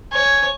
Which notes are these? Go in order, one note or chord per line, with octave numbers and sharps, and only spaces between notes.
C#5 G#5